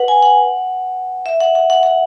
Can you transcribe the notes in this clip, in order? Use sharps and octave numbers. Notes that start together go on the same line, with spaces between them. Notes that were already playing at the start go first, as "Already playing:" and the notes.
Already playing: B4 F#5
G#5
F#5
E5
F#5
F#5
F#5
F#5